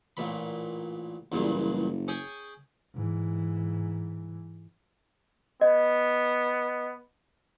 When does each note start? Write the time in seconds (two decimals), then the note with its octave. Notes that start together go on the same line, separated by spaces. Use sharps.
0.17 A1 A#2 B5
1.32 F#1 E2 G2 A#2
2.08 C#4 G#4 G5
2.94 G#2 E3
5.61 B3 D#5